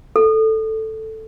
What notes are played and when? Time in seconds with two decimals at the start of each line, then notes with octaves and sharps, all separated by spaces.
0.16 A4